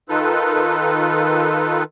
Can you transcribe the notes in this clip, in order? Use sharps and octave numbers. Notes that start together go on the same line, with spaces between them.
D#3 D#4 F4 A4 B4